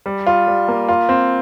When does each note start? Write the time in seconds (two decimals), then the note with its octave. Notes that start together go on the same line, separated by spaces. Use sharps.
0.06 G3
0.27 F4
0.48 G3
0.68 A#3
0.89 F4
1.09 C4